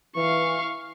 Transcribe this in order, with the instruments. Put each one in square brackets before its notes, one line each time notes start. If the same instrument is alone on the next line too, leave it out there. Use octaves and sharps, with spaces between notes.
[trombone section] E3 [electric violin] F5 C#6